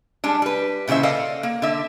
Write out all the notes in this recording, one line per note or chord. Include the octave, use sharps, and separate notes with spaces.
G3 G#3 D4
G3 B4
A#2 C#3 E3 C5 E5
A4 D5 D#5 F5
A#3
D3 E5